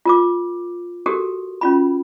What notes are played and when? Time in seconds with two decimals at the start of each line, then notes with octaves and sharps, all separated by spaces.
0.05 F4 A#4 D6
1.06 F#4 G4 A4 A#4
1.61 C#4 F4 B5